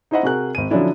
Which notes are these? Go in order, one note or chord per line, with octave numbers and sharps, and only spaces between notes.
D#4 E4 C5 D#5 E5 F#5
C3 F#4 G#4 A#4 F#6
G#1 D#7
D3 F3 F#3 C#4 D4 E4